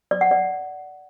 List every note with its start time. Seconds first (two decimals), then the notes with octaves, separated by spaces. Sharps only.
0.11 D5
0.21 F#5
0.31 D5